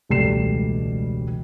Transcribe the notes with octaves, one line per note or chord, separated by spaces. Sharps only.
E1 C#2 G3 A3 C7 E7